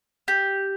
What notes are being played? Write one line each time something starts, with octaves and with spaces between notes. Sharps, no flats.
G4